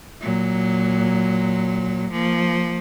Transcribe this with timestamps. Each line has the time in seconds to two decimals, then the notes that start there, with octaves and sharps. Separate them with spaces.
0.21 A#2 F#3
2.12 F3 A#3